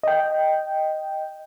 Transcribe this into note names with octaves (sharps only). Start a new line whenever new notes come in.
D#5 G5